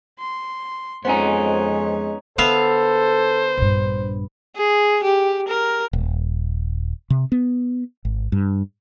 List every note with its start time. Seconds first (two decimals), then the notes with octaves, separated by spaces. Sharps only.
0.19 C6
1.05 F2 G#3 B3 C#4 D#4 C5 C#5 G#5
2.38 D3 B3 A4 C5 E5 F5
3.57 A#1 G2
4.57 G#4
5.03 G4
5.48 A#4
5.93 D#1
7.10 C3
7.32 B3
8.05 G#1
8.32 G2